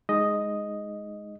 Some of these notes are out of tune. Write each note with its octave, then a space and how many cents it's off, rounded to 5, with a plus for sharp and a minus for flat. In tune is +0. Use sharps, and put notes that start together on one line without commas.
G#3 +0 D#4 +0 D#5 +0